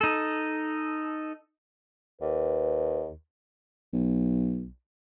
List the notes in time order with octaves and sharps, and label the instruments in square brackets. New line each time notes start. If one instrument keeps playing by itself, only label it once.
[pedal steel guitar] D#4 A4
[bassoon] D#2 [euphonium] B4
[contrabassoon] B1